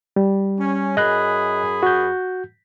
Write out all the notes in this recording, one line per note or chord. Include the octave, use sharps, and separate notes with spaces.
G3
C#4
F#2 G#4 D#5 B5 F#6
F#4 G6